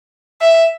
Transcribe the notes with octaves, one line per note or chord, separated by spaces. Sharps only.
E5